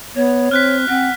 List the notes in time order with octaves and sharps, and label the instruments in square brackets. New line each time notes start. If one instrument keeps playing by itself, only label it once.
[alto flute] B3 [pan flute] C#5
[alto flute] C4 [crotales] F6 F#6 B6
[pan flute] C4 [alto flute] F#5